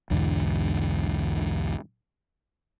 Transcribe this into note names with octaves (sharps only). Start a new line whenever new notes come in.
B1 E2 G#2 D3